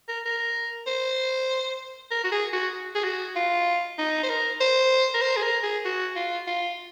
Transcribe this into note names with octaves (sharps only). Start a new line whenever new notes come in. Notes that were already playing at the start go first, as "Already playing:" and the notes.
A#4
A#4
C5
A#4
F#4
G#4
F#4
G#4
F#4
F4
D#4
C5
A#4
C5
A#4
C5
G#4
A#4
G#4
F#4
F4
F4